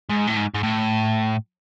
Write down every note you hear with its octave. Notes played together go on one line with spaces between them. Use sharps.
G#2
A2
G#2
G#2
A2